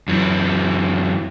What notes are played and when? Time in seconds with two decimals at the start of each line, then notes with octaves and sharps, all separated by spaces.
0.08 F#2 E3